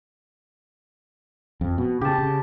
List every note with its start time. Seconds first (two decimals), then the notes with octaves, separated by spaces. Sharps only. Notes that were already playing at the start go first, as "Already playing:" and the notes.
1.61 F2
1.78 B2
2.01 C#3 G4 A5
2.18 C#3